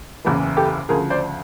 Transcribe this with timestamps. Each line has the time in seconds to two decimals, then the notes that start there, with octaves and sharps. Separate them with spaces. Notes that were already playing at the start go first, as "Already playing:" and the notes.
0.25 F#1 E2 C#3 E3
0.57 G4 A4
0.89 D2 C#3 F3 G#4 A#4
1.10 C5 D5